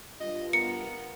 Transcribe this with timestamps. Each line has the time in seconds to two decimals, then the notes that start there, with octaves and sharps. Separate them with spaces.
0.20 G2 F4 D#5
0.53 B3 A#4 C#7